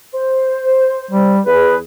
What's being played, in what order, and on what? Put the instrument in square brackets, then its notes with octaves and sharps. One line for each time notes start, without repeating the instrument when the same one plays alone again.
[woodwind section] C5
[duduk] G3
[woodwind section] E2 G#4 [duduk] B4